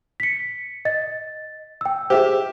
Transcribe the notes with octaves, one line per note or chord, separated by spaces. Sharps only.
B6 C#7
D#5 A6
G5 E6
G4 G#4 C5 E5